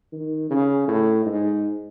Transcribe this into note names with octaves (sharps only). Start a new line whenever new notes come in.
D#3
C#3
A2
G#2